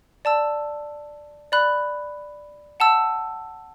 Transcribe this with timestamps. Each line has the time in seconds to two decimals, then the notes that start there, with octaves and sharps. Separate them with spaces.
0.25 D5 A5 E6
1.52 D5 B5 F#6
2.80 F#5 A5 E6